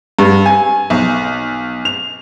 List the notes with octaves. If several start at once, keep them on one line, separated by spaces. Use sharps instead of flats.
G2
G#5
B1
F7